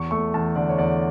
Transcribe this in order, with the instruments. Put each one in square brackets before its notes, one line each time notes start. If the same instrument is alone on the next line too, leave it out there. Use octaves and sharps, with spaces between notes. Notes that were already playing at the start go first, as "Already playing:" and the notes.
Already playing: [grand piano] E2 C#6
A3 C#6
E2 A5
D3 D5
C#5
E2 D5